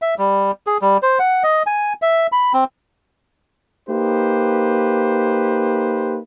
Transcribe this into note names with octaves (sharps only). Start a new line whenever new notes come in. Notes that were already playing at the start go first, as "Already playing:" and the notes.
E5
G3
G#4
G3
C5
F#5
D#5
G#5
E5
B5
C4
A#3 D#4 G4 B4 C5